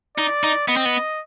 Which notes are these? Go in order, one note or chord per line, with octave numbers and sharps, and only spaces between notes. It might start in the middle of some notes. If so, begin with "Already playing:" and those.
D#4 D5
D#4
B3 D#5
C4
B3